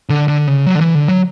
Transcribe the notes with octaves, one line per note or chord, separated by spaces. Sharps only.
D3
D3
C#3
F#3
D3
E3
D3
F#3